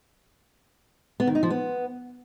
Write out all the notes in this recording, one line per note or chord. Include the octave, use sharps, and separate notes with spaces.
B3
D#3
D#4
F3
B3